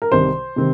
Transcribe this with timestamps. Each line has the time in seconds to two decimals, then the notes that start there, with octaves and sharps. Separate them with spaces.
0.02 A#4
0.11 C2 C3 D#3 C4 C5
0.56 C3 D#3 C4